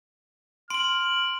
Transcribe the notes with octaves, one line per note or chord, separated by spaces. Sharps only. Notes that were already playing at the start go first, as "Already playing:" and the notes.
C6 F6 D7 F#7